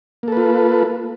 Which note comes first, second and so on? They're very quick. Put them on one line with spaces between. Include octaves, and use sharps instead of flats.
A#3 A4 B4 F4